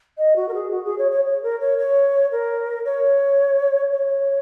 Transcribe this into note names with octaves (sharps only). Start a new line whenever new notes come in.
D#5
F#4
A#4
G#4
F#4
G#4
C#5
C#5
C#5
A#4
C#5
C#5
A#4
C#5
C#5